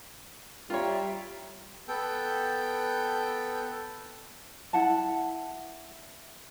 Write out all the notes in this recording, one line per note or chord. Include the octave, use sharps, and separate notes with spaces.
G3 F4 C#5 E5 G5 A#5
B3 A4 G5
E4 F#5 A5